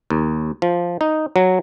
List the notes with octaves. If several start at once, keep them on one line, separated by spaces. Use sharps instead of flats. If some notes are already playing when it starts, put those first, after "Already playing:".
D#2
F3
D#4
F#3